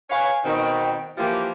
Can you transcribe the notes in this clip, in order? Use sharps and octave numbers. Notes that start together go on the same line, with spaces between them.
B4 C#5 F5 G#5
B2 D#3 C4 G5
E3 F3 A#3 G4